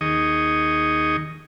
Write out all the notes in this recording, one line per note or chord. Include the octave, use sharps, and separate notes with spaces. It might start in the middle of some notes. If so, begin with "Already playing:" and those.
D#2 D#3 G#4 D#5 C#6 D#6